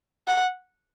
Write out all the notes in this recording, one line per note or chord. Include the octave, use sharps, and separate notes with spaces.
F#5